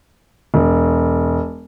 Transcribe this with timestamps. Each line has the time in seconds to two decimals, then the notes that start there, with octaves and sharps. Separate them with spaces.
0.54 E1